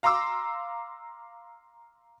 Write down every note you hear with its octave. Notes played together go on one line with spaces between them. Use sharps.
F5 A#5 C6 D6 E6